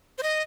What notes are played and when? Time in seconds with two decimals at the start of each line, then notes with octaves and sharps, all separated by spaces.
0.18 C5
0.23 D#5